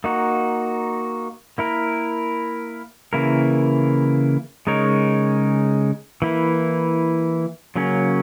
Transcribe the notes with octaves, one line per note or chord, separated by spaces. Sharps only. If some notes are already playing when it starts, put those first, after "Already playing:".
A#3 D#4 F#4
A#3 E4 A#4
C#3 E3 A#3 E4 A#4
C#3 G#3 D#4 A#4 C#5
E3 A#3 E4
C#3 F#3 A#3 C#4